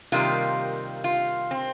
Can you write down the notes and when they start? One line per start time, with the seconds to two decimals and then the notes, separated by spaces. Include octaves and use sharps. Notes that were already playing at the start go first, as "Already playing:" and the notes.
0.12 C3 D#3 G3 A#3 F4
1.04 F4
1.51 C4